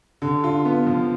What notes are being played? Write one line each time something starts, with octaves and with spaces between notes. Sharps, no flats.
D3
F4
B3
F3